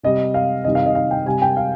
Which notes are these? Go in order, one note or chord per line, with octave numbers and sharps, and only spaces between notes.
C3 G3 D#5
F5
C3 D#3 G3 D#5
F5
D#5
F5
G5
C3 G3 G#5
G5
F5